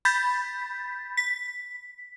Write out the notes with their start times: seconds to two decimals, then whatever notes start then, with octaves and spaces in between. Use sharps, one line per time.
0.05 B5 G6 A6 B6
1.17 B6